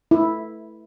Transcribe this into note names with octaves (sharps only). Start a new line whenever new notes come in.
E4